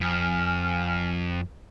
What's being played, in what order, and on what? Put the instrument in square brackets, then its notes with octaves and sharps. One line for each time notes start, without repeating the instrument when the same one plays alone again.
[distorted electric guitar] F2 [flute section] G#5 F6